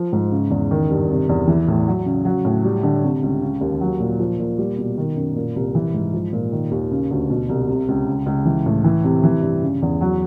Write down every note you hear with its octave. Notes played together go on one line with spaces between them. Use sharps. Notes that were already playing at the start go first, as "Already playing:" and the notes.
Already playing: F3
G#2
C#3
E2
D#3
G2
C3
E2
E3
A2
F#3
C#3
F#3
A2
G3
D3
C3
C#2
C#3
D#2
F#3
A#2
F3
A#2
G3
B2
D#3
F#2
A#2
C2
E3
G#2
F3
A#2
D#3
D#2
C#3
D2
B2
C2
C3
C#2
C#3
C#2
E3
A2
E3
C3
E3
G2
C#3
E2
F#3